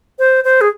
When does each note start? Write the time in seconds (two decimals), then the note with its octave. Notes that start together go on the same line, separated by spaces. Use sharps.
0.19 C5
0.44 C5
0.61 G#4